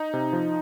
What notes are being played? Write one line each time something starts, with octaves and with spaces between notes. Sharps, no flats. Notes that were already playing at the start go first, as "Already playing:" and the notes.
Already playing: D#4
C3
F3